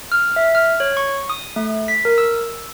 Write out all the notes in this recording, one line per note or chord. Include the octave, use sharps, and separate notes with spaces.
F6
E5
F6
C#5
C#6
D#6
A3
B6
A#4
E6